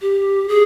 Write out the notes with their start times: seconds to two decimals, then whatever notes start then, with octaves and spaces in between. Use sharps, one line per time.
0.01 G4
0.48 G#4